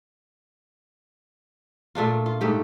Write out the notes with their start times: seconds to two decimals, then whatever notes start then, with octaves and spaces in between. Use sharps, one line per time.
1.95 A#2 A3 D4 F4
2.26 F4
2.41 G#2 A3 G4